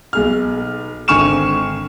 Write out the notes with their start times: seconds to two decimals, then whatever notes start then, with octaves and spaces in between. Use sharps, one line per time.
0.13 B1 G#4 F6
1.08 G#1 D3 G#5 C#6 F6 E7